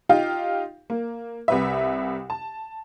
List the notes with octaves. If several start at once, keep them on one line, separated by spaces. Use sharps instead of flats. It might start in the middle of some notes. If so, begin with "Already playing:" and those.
D#4 F4 G4 F5 G5
A#3
C2 B4 E5
A5